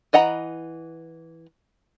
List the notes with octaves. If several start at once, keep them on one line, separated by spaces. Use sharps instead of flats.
E3 D#5 F#5 A#5 B5